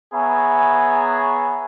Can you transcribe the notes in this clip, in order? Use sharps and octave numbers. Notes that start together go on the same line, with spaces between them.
B3 G#4 C#5 E5 G#5 A#5